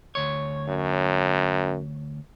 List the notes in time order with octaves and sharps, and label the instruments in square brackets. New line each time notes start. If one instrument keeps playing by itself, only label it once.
[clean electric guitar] D2 C#5
[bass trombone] F#2